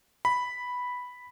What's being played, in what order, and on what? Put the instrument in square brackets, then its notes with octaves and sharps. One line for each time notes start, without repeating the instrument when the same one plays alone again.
[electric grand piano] B5